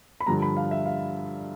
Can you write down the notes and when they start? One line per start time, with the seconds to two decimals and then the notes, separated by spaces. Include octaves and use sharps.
0.21 B5
0.27 G2 D3 F3 A#5
0.42 B5
0.57 F5
0.71 E5
0.86 F5